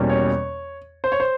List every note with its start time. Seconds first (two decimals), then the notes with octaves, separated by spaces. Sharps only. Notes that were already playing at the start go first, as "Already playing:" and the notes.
Already playing: E2 B2 G3 A#3 C#4
0.10 C#5
1.04 C5
1.12 C#5
1.20 C5